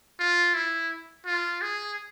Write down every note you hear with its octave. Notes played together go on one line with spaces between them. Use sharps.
F4
E4
F4
G#4